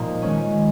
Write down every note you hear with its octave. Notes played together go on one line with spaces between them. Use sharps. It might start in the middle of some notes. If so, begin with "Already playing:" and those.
Already playing: A#2 F3 A#3 D#4
D#3 G#3 C#4